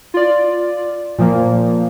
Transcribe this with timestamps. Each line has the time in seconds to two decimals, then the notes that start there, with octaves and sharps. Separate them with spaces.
0.14 F4 D5
1.18 A#2 F3 A#3